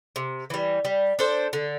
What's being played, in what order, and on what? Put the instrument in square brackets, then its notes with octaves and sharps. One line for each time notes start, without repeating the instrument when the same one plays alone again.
[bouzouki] C3
E3 G3
G3
D4 A4 C5
D3